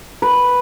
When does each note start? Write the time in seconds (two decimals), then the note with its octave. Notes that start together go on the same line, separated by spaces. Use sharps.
0.22 B4